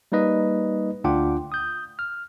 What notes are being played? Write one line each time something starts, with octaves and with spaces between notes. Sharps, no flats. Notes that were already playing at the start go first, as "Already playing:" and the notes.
G3 A#3 D#4 B4 D#5
D2 D4 F4 F#5 G5 D6
D#6 G6
F6